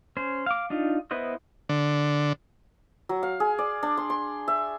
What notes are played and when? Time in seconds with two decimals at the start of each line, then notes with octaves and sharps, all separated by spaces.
0.17 C#4 C5
0.46 F5 D6
0.70 D4 D#4 F4
1.11 B3 E4 B4 C5 D#5
1.69 D3
3.09 F#3
3.23 F5
3.40 G#4
3.59 D5
3.83 D4
3.97 C6
4.10 C6
4.48 E5